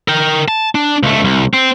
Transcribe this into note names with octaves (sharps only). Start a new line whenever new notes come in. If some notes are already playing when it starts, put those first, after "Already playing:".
A#4 G5
A5
D4
C#2 A3
C2
C4